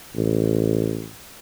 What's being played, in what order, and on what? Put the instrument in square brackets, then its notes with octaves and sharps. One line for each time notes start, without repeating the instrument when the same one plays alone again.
[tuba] A1